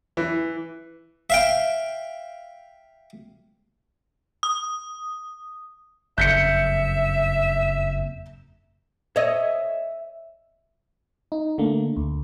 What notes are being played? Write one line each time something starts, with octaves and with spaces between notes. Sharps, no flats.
E3
E5 F5 G5
D#6
F#1 F2 E5 G6 B6 C#7
C#5 D#5 E5
D#4
D3 A3 A#3
D2